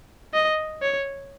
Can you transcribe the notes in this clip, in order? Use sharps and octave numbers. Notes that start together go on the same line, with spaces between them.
D#5
C#5